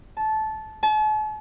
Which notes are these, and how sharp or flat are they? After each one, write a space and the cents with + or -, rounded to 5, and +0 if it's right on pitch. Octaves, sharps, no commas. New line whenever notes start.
A5 -15
A5 -45